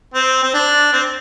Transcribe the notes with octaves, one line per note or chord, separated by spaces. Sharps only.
C4
C4
D4
C4